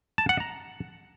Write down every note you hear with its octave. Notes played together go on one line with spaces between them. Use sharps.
A5
F#5
A#5